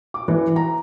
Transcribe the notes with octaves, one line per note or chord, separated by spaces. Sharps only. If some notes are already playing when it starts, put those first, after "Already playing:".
D6
E3
A#5